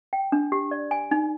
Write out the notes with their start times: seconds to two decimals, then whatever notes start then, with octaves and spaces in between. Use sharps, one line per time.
0.13 G5
0.32 D4
0.52 G4
0.71 D5
0.91 G#5
1.11 D#4